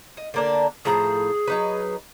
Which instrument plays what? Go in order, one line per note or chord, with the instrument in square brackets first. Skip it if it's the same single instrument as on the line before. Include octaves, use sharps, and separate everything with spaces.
[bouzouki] D#5
D3 A#3 D4
[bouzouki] A2 F3 A#5 [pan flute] G#4
[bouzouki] F#3 D#4 B4